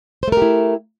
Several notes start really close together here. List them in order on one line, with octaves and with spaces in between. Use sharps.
C5 A3 A#4 G4 E4